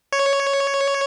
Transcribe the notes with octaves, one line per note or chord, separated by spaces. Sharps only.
C#5